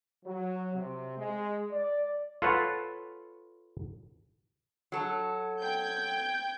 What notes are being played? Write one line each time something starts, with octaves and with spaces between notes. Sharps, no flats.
F#3
C3
G#3
D5
F4 A4 B4 C#5 F#5
F#3 A4
G5 G6 G#6